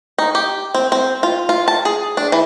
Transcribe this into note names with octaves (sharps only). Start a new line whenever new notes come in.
D#4
G4
C4
C4
F4
F4
A5
G#4
D4
E3